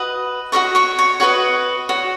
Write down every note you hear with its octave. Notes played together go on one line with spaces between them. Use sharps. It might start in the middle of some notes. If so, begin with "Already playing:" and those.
Already playing: F#4 B4 D#5 D#6
F#4 A#4 C#5 D#5 C#6
C#5 C#6
C#5 C#6
F#4 B4 C#5 D#5 C#6
F#4 C#5